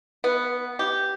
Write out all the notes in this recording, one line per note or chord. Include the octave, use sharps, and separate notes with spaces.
B3
G4